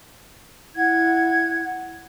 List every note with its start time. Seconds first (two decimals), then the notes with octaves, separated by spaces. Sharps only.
0.75 E4 F#5 G#6